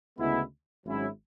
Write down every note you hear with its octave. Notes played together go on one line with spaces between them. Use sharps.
D2 C#3 G#3 B3 E4
G#1 G#2 F#3 C#4 E4